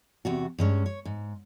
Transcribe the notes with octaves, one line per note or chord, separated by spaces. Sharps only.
E2 C3 F#4
G2 G#3 C#4
C#5
G#2